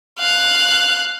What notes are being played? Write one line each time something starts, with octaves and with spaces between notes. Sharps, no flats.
F5 F#6